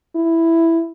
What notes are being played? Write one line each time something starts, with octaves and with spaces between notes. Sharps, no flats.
E4